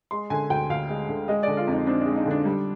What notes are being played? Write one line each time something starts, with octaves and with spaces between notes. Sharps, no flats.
G#3 C6
D3 G#5
D2 G5
D2 F5
G#3
D3
G#3 D#5
D3 D5
F4
F2
D#4
C4 D4
G#3 D4
D#4
D3 D4
G3